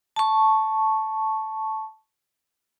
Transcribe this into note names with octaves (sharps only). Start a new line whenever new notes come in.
A5 C#6